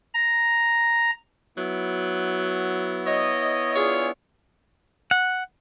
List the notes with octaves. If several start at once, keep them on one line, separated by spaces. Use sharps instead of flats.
A#5
F#3 B3 E4
C#5 D#5
D4 F4 G#4 C#5
F#5